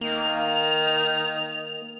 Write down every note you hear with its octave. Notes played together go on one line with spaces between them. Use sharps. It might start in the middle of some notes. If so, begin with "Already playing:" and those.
D#3 A#3 F7